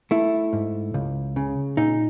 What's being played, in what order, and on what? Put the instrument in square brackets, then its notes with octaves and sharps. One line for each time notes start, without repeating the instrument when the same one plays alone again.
[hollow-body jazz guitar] A3 E4
G#2
C#2
C#3
A#2 D#4